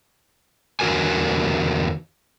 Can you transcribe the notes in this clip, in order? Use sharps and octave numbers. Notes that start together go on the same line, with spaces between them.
E2 D3 F#4 A#4 G#5